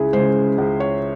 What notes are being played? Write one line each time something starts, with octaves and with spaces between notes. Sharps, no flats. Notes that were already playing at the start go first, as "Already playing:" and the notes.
Already playing: C#2 E4 G#4
C#3 G#3 C5
C#2
C#5